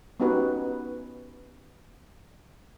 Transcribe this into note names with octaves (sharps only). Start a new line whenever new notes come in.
B3 C#4 D#4 F#4 G4 B4